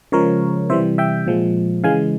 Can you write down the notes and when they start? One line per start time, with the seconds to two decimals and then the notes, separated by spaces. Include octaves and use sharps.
0.12 C#3 F3 G#3 A#4 C#5
0.70 C3 E3 G3 C5 E5
0.98 E5 G5
1.26 A#2 F3 G#3
1.84 C#3 E3 G#3 F5 G#5